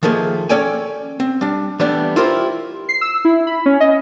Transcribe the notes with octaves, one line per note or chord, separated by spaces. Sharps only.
D#3 F3 A3 A#3 G#4
C#4 A4 C#5 D5 G5 G#5
C4
G3 D4
E3 G3 A3 B3 D4
E4 F4 G4 A#4 C5
C7
E6
E4
B5
C#4
D#5